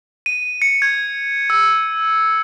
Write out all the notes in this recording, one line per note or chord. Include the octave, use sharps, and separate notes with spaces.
D#7
C#7
G#6
E6